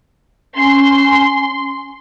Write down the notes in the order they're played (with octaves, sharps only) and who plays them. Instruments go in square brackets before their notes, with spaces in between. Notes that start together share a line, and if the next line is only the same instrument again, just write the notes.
[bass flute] C#4 [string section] C6